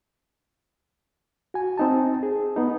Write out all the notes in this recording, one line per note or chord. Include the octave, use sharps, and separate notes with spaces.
F#4 G#5
C4 D#4 A5
G#4
B3 D#4